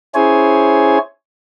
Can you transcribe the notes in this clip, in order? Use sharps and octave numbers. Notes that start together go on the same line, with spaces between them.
C#4 E4 G#4 C5 C#5 G#5